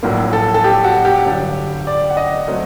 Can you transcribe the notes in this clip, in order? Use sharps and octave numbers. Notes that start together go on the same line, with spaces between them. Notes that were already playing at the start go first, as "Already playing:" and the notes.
A#1 A2 F#3 A#3
A4
A4
G4
F#4
G4
G1 G2 F#3 G4
D5
F#5
D#5
F#3 A3 C4